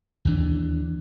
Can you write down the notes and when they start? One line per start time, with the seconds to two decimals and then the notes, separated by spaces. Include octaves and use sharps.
0.25 D#2 E3 D4